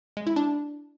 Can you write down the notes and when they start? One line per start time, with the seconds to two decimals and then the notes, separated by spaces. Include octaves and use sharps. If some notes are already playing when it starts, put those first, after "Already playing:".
0.17 G#3
0.27 E4
0.36 D4